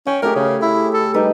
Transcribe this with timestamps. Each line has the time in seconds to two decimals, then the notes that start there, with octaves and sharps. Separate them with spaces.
0.07 C#4 G5
0.22 A3 G4 G#4 A#4
0.36 C#3 C#5
0.62 E4
0.94 A4
1.14 G3 D#4 B4